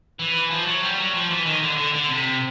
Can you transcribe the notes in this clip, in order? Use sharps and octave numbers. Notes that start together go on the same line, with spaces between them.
E3
F3
F#3
G3
F#3
F3
E3
D#3
D3
D3
D3
C3